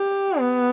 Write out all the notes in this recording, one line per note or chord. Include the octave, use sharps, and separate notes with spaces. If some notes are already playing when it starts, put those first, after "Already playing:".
Already playing: G4
B3